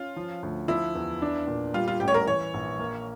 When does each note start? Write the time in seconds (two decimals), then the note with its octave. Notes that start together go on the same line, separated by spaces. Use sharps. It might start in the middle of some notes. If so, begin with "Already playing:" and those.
Already playing: C#4 F4
0.16 F3
0.43 D2
0.68 F3 E4
0.95 E2
1.22 D4
1.47 A#2
1.74 G3 F4
1.88 F4
2.00 A1 G4
2.08 C#5
2.14 A#4
2.27 E3 C#5
2.54 A#1
2.79 A#3